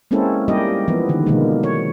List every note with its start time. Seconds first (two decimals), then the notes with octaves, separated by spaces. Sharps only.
0.11 G#3 A#3 C4 C#4 E4 A4
0.48 G3 A#3 D#4 E4 G4 D#5
0.88 E3 F3 B3
1.09 D3 D#3
1.26 B2 D3 D#3 G#3 A#3
1.63 C#5